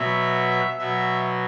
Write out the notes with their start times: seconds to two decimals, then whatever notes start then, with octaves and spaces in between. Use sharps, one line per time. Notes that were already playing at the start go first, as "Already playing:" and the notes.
Already playing: B2 F#3 E5
0.79 B2 F#3 E5